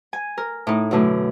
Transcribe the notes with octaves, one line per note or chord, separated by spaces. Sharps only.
G#5
A#4
A2 D#4
F#2 B2 D3 A3 E4